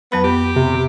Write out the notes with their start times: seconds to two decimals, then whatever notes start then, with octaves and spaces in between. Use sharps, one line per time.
0.12 F2 F#3 B3 B5
0.24 B3 G4
0.56 C3